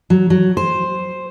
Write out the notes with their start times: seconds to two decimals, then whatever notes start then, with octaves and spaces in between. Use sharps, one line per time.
0.10 F#3
0.30 F#3
0.57 C5